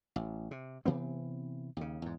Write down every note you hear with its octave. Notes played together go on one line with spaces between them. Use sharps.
A1
C3
C3 E3 B3 C4
D#2 C#3
E2 G#2